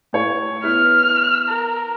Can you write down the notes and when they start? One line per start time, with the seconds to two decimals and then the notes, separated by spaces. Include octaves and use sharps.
0.13 A2 C#5
0.63 B3 E4 F6
1.49 A#4